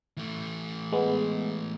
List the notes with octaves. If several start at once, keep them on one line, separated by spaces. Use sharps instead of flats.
E3 A3
G#3 B3